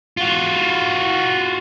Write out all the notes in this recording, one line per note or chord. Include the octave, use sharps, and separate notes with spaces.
F4 F#4